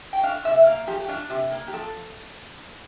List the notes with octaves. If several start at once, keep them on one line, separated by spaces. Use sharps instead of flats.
G5
D4 F5
C3 E5
A#3 F5
F3 G4
G4
D4 F4
C3 G4
A#3
G4
F3 A4